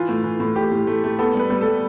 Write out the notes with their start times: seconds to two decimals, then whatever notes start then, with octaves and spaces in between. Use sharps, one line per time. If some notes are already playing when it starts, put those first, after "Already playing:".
Already playing: E3 F4
0.09 A2
0.24 E3
0.40 A2
0.56 A2 G4
0.72 A2
0.87 A3
1.04 A3
1.19 B3 A4
1.35 G3 B4
1.50 G3
1.61 G3 A4